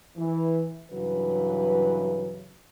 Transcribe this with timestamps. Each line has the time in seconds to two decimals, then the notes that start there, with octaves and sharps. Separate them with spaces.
0.17 E3
0.92 G2 C#3 E3 F#3 B4